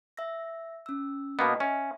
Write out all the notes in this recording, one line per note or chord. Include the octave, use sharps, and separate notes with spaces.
E5 E6 A#6
C#4 E6
B2 A#3 B3 D#5
C#4 E5